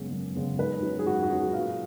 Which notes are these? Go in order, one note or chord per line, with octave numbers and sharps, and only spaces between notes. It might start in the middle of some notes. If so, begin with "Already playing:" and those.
Already playing: F#2 C#3 G#3 B3
F#2
C#3 G#3 B3
G#2 B4
F#3 C#4
G#4
G#2 F#4
F#4
F#3 C#4
G#4
A#2 F5